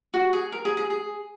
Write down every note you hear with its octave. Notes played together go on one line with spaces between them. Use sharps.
F#4
G#4
A#4
G#4
G#4
G#4